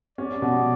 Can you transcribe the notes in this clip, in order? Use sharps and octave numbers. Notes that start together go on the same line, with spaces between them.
C#4 D5
B2